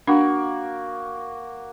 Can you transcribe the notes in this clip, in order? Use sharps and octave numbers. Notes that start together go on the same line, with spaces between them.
A#3 D4 F#4